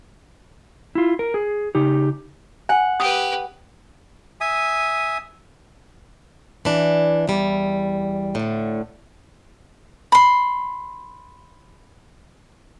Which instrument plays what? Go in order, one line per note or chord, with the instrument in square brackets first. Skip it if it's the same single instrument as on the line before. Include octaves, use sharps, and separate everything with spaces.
[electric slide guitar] E4 F4
A#4
G#4
C#3 D#4 G4
[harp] F#5 [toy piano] G#5
[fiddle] G4 B4 [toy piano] D#6
[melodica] E5 G#5 D#6
[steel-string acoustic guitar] E3 D4
E2 G3
A2 D3
[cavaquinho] B5 C6